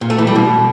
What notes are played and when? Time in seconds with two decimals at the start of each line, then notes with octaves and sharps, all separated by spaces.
0.01 A#2
0.10 A3
0.18 E3
0.27 G3
0.36 B2